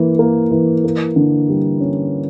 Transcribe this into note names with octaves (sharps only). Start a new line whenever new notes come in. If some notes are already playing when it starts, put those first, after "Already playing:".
Already playing: E3 A#3
A#3
E3
A#3
D3
G3
C#4